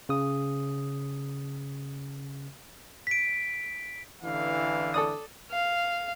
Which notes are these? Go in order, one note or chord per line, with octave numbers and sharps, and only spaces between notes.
C#3 D#6
B6 D7
A1 D3 E3 F5
A4 D5 D#6
F5